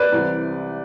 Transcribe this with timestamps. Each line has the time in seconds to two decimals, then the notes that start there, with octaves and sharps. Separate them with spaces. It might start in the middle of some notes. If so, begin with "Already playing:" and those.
Already playing: B4 D5
0.12 C2 C3 E3